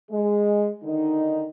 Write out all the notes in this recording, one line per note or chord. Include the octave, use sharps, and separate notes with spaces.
G#3
D3 D#3 D#4